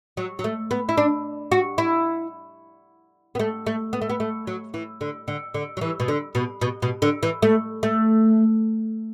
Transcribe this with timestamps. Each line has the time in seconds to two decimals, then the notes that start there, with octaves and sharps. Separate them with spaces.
0.17 F#3
0.39 F#3
0.44 A3
0.71 B3
0.89 E4
0.97 D4
1.52 F#4
1.78 E4
3.35 B3
3.39 A3
3.66 A3
3.93 B3
4.01 A3
4.10 B3
4.20 A3
4.47 F#3
4.74 E3
5.01 D3
5.28 D3
5.54 D3
5.77 F#3
5.81 E3
6.00 B2
6.08 D3
6.35 B2
6.61 B2
6.82 B2
7.02 D3
7.23 E3
7.42 A3
7.83 A3